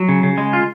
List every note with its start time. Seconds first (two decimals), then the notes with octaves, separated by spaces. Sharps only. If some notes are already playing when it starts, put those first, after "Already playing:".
Already playing: F#3
0.09 C#3
0.23 C#3
0.38 G#3
0.53 F4